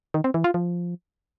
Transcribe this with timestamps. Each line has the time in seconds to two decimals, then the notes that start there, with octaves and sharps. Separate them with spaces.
0.14 D#3
0.24 C4
0.34 E3
0.44 F4
0.54 F3